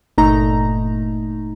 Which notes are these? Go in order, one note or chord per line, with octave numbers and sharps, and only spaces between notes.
G1 A#2 A3 D#4 A#5